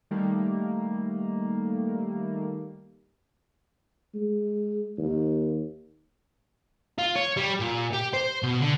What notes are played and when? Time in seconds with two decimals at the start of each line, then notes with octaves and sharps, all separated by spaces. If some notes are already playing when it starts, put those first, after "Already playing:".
0.11 D#3 G3 A3 A#3
4.15 G#3
4.98 D#2
6.98 F4
7.16 C#5
7.37 G3
7.60 A#2
7.93 G4
8.13 C5
8.43 B2
8.61 D3